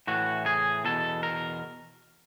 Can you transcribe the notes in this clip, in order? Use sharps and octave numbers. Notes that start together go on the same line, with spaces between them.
A2 E3 F#4
G#4
E2 B2 A4
A#4